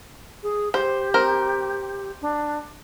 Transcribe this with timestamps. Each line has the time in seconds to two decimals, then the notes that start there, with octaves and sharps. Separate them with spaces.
0.43 G#4
0.74 G4 C5
1.14 C4 A#4
2.22 D4